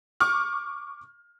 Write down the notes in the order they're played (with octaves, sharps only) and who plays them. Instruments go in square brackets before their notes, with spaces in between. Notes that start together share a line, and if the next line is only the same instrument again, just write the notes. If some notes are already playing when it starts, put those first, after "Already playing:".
[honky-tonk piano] C#6 D6 F6